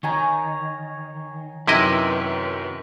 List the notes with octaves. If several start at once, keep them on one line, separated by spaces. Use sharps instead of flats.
D#3 C#5 G#5 A#5
F#2 C3 D#3 E4 B4 D#5